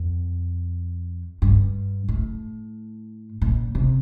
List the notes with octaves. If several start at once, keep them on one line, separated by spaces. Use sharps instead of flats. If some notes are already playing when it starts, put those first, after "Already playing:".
Already playing: F2
G2
A2
A#2
C3